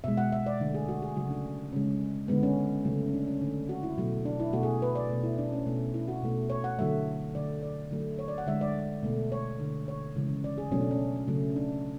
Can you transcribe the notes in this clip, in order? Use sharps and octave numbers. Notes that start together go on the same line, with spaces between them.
B2 G#3 E5
F#5
E5
D5
D3 A3
G#4
F#4
G#4
C#3 F#3 A3 F#4
D4
C#3 G#3 C#4
D3 G#3 B3
C#4
C#3 F#3 A3
C#4
D4
C#4
D3 A3 D4
F#4
E4
B2 F#3 A3
D4
E4
B2 A3 F#4
G#4
B4
D5
B2 A3
E4
D4
C#4
B2 A3
E4
F#4
B2 A3
C#5
F#5
D3 F#3 A3 E5
D3 A3 D5
D5
D3 F#3 A3
C#5
D5
F#5
D3 G#3 E5
D5
B2 A3
C#5
D3 A3
C#5
C#3 E3 G#3
D5
G#4
B2 F#3 A3 C#4
D4
C#4
C#3 F#3 A3
D4